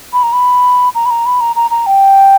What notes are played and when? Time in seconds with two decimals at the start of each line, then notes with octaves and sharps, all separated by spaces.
0.13 B5
0.23 A#5
0.32 B5
0.94 A#5
1.05 B5
1.10 A#5
1.25 B5
1.40 A#5
1.56 A#5
1.70 A#5
1.86 G5